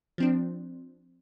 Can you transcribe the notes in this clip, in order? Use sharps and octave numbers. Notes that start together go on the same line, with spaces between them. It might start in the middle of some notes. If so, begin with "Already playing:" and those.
F3 C4 D4